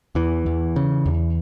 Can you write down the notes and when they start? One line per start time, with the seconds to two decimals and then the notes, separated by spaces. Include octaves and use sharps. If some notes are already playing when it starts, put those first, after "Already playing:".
0.15 E2 E3
0.46 E2
0.76 C#3
1.06 E2